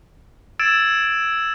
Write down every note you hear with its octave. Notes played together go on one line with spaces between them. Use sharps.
E6 G#6 A6 D7 E7